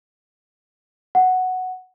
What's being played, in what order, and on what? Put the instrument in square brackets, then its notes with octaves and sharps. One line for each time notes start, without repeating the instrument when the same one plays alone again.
[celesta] F#5